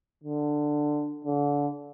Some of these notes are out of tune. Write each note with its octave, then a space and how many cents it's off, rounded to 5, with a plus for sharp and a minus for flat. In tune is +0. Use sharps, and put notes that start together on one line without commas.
D3 +10
D3 -30